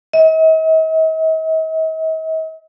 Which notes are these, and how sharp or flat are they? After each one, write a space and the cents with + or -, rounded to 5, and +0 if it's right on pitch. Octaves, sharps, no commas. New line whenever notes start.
D#5 +45